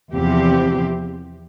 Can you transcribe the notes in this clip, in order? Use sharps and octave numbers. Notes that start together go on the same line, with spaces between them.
E2 C3 F3 C4 G4